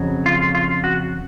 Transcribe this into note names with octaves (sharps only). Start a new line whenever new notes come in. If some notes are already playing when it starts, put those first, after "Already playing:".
Already playing: F2 C#3 F#3
F4
F4
F#4